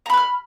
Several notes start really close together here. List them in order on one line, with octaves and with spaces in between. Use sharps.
A#5 B5 F#6 F6